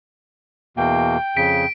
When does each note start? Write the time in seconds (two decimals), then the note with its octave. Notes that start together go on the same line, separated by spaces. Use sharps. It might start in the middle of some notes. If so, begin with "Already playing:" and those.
0.77 E2 B2 A#3 G5
1.37 F2 C#3 B6 D7